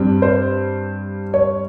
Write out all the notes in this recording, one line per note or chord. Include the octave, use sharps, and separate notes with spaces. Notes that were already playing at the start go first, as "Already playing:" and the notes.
Already playing: G2 G3 C4
C5
C#5